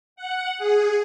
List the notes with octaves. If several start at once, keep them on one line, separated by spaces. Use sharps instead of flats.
F#5
G#4